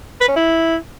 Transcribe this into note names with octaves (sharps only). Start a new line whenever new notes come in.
B4
C#4
E4